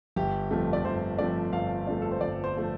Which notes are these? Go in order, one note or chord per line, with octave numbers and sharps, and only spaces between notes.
G1 G4
F2 F3 A3
D5
G1 C5
F2 F3 A3 D5
G1 F5
F2 F3 A3 D5
A4
C5
G1 D5
C5
F3 A3